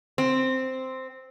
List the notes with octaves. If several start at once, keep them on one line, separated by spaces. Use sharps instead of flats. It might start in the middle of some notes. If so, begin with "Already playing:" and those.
C4